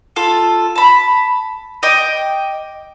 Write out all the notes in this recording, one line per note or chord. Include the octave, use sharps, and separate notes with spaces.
F4 A4
A5 B5
D#5 G5 D6